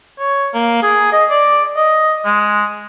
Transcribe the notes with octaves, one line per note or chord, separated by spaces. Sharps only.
C#5
A#3
G#4
D#5
D5
D#5
G#3